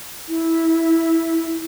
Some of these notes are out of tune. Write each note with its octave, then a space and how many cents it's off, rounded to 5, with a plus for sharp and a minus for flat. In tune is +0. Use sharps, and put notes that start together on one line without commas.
E4 -10